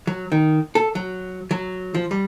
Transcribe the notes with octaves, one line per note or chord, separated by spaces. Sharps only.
F#3
D#3
A4
F#3
F#3
F3
G3